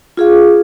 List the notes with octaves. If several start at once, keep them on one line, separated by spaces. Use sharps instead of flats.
F4 G#4 F5